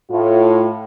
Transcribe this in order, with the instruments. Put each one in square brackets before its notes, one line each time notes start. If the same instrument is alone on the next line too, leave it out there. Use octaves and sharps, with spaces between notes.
[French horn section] A2 F4